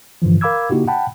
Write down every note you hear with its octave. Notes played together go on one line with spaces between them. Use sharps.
G2 D3 E3 F3
A#4 F5 B5 D6 E6 G#6
C#3 A#3 D#4 E4 F#4 G4
F#5 G5 A5 B5